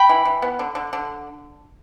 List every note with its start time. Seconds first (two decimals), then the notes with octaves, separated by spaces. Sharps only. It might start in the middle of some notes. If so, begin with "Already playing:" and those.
Already playing: G5 B5
0.09 E3
0.25 E3
0.42 B3
0.59 D3
0.75 D3
0.93 D3